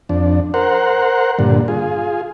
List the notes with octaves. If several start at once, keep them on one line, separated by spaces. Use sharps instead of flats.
F2 D4
A#4 C5 F#5
G2 A#2 D3
F4 G#4